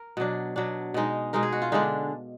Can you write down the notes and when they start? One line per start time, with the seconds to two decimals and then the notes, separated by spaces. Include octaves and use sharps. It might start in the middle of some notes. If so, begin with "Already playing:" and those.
Already playing: A#4
0.17 B2 F#3 D4
0.56 B2 F#3 D4
0.94 B2 G#3 D#4
1.33 B2 G#3 D#4 A#4
1.43 G#4
1.52 F#4
1.62 F4
1.72 D3 G#3 D4 D#4